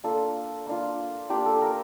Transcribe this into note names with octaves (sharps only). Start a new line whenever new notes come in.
A#3 D4 F4 A4
A#3 D4 F4
A#3 D4 F4 G4
A4
A#4